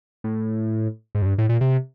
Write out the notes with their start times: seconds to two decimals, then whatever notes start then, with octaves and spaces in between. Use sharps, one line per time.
0.24 A2
1.15 G#2
1.22 F#2
1.26 G2
1.38 A2
1.49 A#2
1.61 C3